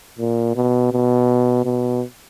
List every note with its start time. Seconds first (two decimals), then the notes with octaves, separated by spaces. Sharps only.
0.18 A#2
0.56 B2
0.92 B2
1.65 B2